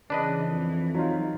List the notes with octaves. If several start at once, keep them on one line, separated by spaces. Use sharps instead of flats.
C#3 E3 D4 B4 D#5
F2
F#3 D#4 F4